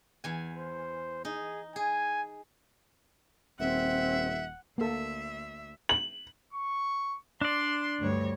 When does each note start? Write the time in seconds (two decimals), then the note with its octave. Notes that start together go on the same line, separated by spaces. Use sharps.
0.24 E2 G#5
0.56 C5
1.25 D#4 G#4
1.76 G#4 G#5
3.60 D#1 C4 E5 F#5
4.78 D2 A#3 A4 E5
5.89 F#7
6.53 C#6
7.41 D4 D5 C6
7.99 D2 G2 C#5